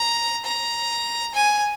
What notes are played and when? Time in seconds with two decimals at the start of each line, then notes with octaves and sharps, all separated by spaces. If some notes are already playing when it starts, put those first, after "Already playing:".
Already playing: A#5
0.44 A#5
1.34 G#5